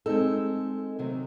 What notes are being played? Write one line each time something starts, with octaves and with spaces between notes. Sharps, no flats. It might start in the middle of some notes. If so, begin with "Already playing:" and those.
G#3 C4 D#4 A4
C3 D#3 F#3 A3